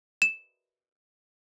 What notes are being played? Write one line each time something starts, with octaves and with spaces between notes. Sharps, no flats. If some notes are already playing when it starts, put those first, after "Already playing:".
E7